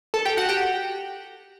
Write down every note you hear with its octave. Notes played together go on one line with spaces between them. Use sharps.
A4 A5
G4 G5
F#4 F#5
G4 G5